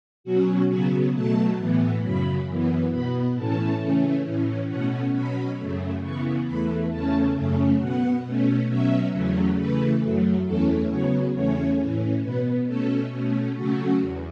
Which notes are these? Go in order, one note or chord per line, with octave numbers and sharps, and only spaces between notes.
B2 F#3 C#4 F#4
C#3 F#3 B3 F#4
B2 F#3 A3 A5
A2 E3 B3
F#2 C#3 F#3 B5
F#2 E3 B3
B2 B3 B5
A2 E3 A3 C#4 A5
C#3 E3 A3 C#4
A2 E3 C#4
B2 A3 C#4 F#5
B2 F#3 C#4 B5
F#2 C#3 A3
C#3 E3 B3 C#6
E2 E3 A3 B5
E2 C#3 A3 C#4 A5
F#2 C#3 A3 C#4
B2 B3 F#5
B2 A3 C#4
B2 F#3 C#4 E5
E2 C#3 F#3 A3 C#4
C#3 E3 A3 B4
F#2 F#3 A3
E2 E3 A3 C#4 A4
C#3 F#3 B3 C#5
E2 C#3 A3 C#4 C#5
A2 E3 C#4
B2 B3 B4
B2 A3 C#4 A4
B2 A3 C#4
C#3 F#3 A3 C#4 F#4
E2